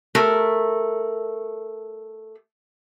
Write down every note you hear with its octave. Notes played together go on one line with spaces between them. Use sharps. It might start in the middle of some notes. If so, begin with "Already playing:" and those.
A3 A#4